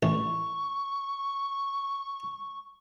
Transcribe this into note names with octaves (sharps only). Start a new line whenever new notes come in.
A1 C#6